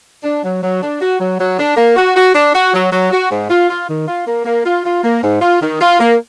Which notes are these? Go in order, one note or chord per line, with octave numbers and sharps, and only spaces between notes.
D4
F#3
F#3
D4
F#4
F#3
F#3
D4
A#3
F#4
F#4
D4
F#4
F#3
F#3
F#4
G#2
F4
F4
D#3
F4
A#3
A#3
F4
F4
A#3
G#2
F4
D#3
F4
A#3